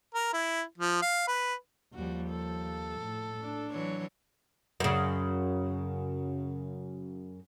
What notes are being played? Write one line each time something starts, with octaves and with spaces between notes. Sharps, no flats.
A#4
E4
F3
F5
B4
D#2 F3 G3 F#4
A4
A2
D4
E3 F#3 C#5
F#2 C#3